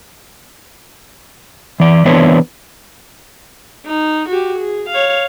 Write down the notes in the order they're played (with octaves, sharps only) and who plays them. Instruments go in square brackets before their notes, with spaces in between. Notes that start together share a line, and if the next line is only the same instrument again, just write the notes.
[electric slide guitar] E3 D5
E3 B3 C4 D4 B4 C#5
[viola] D#4
F#4 G4
G#4
C#5 F5